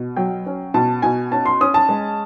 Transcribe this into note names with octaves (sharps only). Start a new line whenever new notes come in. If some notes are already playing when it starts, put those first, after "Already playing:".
Already playing: B2
F#3 G5
C#4
B2 A5
B2 G#5
C#4 A5
C6
C#4 D#6
A5
G#3